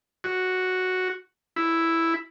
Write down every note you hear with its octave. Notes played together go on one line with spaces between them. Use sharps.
F#4
E4